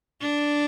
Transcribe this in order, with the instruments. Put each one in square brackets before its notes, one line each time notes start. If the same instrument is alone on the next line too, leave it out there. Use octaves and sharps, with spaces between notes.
[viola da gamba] D4